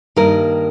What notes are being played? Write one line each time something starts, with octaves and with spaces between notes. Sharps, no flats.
G2 D#3 A#3 A#4